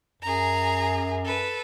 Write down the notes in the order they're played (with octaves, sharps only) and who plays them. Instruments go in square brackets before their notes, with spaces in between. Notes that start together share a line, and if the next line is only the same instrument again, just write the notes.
[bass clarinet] F#2 [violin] G#4 A#5
[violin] A4 B4